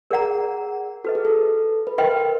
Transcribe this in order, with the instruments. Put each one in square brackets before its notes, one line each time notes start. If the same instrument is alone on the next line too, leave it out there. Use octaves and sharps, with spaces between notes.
[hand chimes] G#4 [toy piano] A#4 D5 F#5 A#5
[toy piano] F#4 B4 D#5 [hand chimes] A4
[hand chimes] G#4
A4
B4
[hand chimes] A#4 [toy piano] B4 D#5 G5 C6